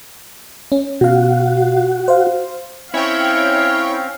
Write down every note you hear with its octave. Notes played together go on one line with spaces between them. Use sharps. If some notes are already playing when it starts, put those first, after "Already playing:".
C#4
B2 F#4 F5
C5 F5
C4 C#4 E4 C#5 F5 G5